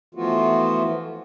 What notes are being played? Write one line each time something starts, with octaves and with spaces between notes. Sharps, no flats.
E3 F3 A3 B3 F4 F#4